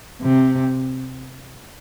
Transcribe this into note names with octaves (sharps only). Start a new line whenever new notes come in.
C3